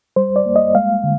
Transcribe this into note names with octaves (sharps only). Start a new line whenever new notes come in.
G3 C5
D5
A#3
D#5
G#3 F5
D3